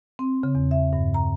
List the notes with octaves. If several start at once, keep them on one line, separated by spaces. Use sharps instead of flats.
C4
C#3
E2
E5
G2
A#5